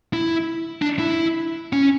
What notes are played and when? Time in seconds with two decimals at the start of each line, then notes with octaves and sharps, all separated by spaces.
0.13 E4
0.82 D4
0.99 E4
1.73 C#4